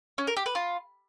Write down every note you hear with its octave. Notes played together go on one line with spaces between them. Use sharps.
C#4
A#4
G4
B4
F4